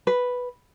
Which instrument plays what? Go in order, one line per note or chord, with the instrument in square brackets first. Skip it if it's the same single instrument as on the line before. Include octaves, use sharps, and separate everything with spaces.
[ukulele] B4